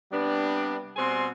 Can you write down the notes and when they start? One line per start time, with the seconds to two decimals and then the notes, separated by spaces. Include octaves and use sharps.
0.12 C3 G3 B3 D4
0.96 B2 G3 C4 G#5 C6